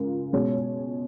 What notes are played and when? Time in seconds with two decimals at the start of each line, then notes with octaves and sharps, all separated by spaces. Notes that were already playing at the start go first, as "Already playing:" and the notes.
Already playing: C#3 G#3 F4 A#4
0.33 B2 G#3 C#4 F#4 C#5